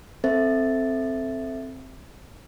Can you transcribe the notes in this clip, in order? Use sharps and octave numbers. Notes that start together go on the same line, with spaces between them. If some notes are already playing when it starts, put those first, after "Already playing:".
C4 A4 C5 E5 A6